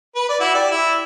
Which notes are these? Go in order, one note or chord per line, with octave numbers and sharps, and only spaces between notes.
B4
D5
E4 F#4
G4 D5
E4